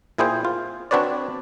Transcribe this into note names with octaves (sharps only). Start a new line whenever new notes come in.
A#2 E4 G#4 C5 G5
F4
C4 D4 F#4 B4 C#5 D5